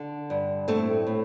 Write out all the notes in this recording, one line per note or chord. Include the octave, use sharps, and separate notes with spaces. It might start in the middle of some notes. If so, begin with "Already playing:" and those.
Already playing: D3
G2
A2 A3 C4
A2